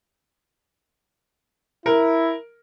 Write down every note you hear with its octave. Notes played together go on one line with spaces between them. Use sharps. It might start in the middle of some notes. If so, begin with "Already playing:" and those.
E4 A#4